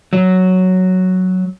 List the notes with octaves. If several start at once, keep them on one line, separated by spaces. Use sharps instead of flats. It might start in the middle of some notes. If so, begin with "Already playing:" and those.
F#3